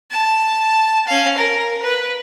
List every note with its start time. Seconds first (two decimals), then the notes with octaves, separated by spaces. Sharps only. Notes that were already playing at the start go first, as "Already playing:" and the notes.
0.11 A5
1.08 C#4 F5
1.37 A#4
1.83 B4